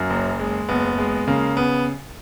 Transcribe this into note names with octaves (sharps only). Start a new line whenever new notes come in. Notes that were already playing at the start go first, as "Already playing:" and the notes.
Already playing: F#2 A#3 C#4
F#1
G#3
F#1 B3
G#3
C#3 A#3
B3